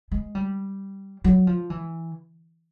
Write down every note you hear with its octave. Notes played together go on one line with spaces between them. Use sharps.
G#3
G3
F#3
F3
E3